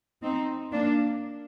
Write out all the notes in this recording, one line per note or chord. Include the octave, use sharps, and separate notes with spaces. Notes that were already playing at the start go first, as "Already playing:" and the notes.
C4 D#4
A#3 D4